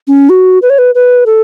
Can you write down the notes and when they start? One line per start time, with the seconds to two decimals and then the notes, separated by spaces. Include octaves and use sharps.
0.08 C#4
0.29 F#4
0.62 B4
0.70 C#5
0.78 B4
0.95 B4
1.26 A4